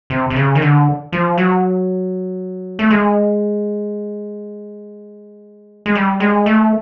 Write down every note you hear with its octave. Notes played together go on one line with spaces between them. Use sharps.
C3
C3
C#3
D#3
D3
F3
F#3
A3
G#3
G#3
G3
G#3
A3